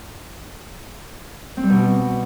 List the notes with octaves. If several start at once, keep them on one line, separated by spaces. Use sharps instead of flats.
C4
G3
B2